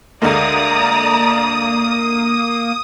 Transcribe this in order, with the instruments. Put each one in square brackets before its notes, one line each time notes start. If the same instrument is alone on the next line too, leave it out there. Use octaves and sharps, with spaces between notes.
[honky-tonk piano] D2 D3 G#3 [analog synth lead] A#3 [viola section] D5 A#5 [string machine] D#6